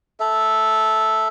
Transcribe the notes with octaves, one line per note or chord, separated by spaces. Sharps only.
A4 E5